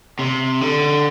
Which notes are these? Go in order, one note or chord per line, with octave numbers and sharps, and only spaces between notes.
C3
D3